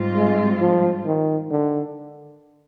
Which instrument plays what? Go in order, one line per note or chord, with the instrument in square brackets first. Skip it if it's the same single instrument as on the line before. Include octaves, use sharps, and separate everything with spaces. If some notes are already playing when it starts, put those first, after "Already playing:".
Already playing: [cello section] G#2 G3 C4 F4
[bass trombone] G#3
F3
D#3
D3